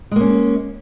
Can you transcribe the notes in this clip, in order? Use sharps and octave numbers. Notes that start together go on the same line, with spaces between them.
G#3 A#3 C#4